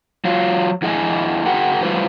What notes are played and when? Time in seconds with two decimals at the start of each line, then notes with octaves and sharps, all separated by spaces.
0.25 F#3 F4
0.82 F2 E4 G#4 D#5 E5 G#5
1.46 F#4 G#4 A#4 F#5 G5
1.83 F#3 G3 E4 F4 B4 C5